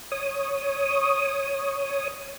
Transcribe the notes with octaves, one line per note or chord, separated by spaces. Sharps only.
C#5 D#6